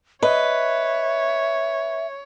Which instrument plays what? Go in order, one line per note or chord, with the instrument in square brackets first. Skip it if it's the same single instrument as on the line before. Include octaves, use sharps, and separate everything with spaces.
[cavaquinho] B4 [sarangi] C#5 [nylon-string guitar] D#5 [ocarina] E5